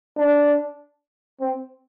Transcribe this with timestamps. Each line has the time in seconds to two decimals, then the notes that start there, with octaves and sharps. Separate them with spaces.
0.17 D4
1.41 C4